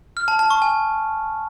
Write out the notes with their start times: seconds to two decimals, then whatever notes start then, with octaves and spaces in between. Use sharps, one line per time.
0.17 F6
0.28 A5
0.39 A5
0.50 C#6
0.62 G#5